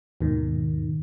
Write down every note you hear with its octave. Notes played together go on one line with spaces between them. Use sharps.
D#2 G#2 B2 D#3